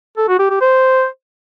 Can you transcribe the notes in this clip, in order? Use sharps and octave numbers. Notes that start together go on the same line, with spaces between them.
A4
F#4
G4
G4
C5